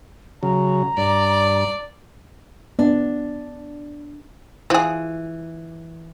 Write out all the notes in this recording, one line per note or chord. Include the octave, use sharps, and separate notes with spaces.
C#3 F#3 A#5
G2 D5
B3 D4
E3 F3 G#4